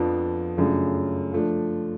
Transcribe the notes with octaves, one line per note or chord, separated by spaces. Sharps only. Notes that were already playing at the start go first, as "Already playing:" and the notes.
Already playing: F2 F3 B3 D4
F#2 C#3 F3 A3 D4
F3 A3 D4